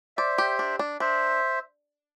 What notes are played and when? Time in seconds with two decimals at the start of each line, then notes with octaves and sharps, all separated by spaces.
0.17 C5 D5 E5
0.38 G4
0.59 D4
0.79 D4
1.00 D4 C5 E5